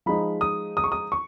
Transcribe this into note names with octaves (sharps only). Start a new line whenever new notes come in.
F3 G#3 D#4 B5
D#6
D#6
C#6
D#6
C#6